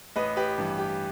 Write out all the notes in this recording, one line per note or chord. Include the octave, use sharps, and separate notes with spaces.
A1 B4 D#5
G4 B4
G2 E3
G4